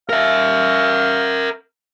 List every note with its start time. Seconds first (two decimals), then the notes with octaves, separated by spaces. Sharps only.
0.09 A#4 E5 F5